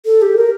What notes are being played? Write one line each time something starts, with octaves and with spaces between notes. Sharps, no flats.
A4
G4
A#4